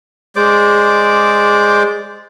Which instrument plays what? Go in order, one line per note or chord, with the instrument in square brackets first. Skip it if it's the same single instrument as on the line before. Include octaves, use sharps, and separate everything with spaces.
[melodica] G#3 C5 D5 D6